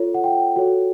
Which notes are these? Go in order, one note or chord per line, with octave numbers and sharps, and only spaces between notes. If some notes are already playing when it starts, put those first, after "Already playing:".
Already playing: F4 A4 C#5
F#5
G5
F#4 A4 C#5